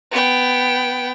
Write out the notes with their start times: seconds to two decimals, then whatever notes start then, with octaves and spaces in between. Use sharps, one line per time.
0.12 B3 G5